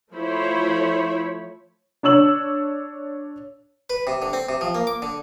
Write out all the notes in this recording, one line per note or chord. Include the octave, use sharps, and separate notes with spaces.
F3 A3 E4 C5 C#5 B5
D4 C#5 E6 F#7
B4
C3
D3
C4
C3
F3
A#3
D6
D3